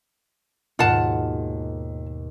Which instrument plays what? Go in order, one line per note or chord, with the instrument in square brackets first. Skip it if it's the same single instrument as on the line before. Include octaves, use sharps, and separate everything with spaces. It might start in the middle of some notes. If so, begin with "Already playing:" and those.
[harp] D#2 G#2 B2 [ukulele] F4 F#5 A5